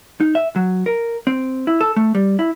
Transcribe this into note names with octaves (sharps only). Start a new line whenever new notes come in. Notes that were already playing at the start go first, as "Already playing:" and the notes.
D#4
E5
F#3
A#4
C4
E4
A4
A3
G3
E4